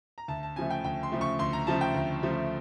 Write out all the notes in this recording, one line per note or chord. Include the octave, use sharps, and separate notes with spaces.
A#5
D2 A5
A5
C#3 F3 A3 G#5
G5
D2 G5
C6
C#3 F3 A3
C#6
D2 C6
A#5
C#3 F3 A3 A5
G5
D2
C#3 F3 A3